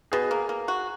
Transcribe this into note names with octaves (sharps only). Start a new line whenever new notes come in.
B2 G#4
A#3
A#3
F#4